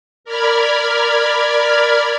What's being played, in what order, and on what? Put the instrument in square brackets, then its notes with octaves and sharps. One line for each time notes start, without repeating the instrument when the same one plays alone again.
[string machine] A#4 D5 B5 F6 G#6